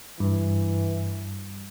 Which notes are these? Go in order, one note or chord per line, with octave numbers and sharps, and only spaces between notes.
G2 E3